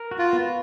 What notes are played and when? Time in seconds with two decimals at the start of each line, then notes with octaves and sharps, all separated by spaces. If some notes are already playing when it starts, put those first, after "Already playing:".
Already playing: A#4
0.11 F#4
0.19 F4
0.33 B3